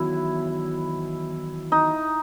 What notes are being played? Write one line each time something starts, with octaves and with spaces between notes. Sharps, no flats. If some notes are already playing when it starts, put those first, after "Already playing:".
Already playing: E2 D#3 F#3 B3 E4 F#4
D#4